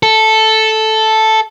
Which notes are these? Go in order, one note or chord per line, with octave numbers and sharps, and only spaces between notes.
A4